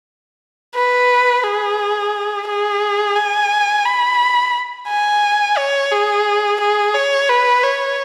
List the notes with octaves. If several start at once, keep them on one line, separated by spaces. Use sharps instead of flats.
B4
G#4
G#4
G#5
B5
G#5
C#5
G#4
G#4
C#5
B4
C#5